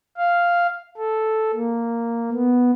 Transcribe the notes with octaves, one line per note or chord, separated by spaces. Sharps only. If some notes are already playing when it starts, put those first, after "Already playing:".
F5
A4
A#3
B3